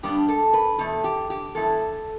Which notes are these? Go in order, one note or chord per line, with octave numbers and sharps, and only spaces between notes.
G2 G3 B3 D4 G4
A4
B4
E2 B2 A3 A4
G4
G4
G2 E3 B3 E4 A4